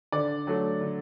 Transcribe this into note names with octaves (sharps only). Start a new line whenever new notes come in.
D3 D5
F#3 A3
D3